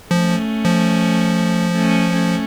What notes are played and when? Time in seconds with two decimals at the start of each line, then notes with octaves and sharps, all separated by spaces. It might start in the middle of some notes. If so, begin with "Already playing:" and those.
0.10 F3 A3 C#4
0.65 F3
1.73 A3 C#4
2.13 A3 C#4